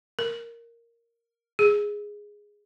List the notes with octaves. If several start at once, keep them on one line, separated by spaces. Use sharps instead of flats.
A#4
G#4